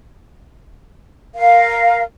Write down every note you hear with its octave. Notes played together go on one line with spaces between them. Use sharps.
A#4 F5